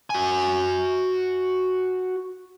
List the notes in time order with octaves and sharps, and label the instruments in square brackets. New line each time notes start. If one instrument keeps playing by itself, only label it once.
[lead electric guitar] F#4 G#5